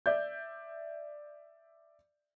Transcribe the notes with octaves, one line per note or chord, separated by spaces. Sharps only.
D5 E5 G6